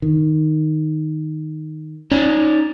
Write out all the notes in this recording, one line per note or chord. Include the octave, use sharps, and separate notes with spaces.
D#3
C#4 D#4 C#5 D5